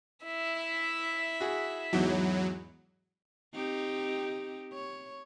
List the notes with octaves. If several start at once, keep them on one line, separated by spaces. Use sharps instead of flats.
E4 E5
F#4 G#4
E2 G#2 E3 F#3
C4 D#4 G4
C#5